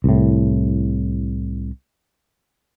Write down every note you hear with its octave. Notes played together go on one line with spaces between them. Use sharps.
C2 A2